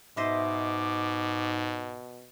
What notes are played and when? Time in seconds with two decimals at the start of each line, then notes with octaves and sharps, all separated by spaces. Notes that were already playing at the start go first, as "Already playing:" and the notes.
0.17 G#2 B2 C5 D#5 E5 D6